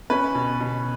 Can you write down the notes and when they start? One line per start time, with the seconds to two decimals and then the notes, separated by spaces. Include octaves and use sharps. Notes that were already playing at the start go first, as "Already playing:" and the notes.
0.10 C#4 B4
0.35 B2
0.60 B2